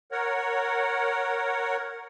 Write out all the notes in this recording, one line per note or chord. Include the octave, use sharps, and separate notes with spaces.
A#4 C#5 F#5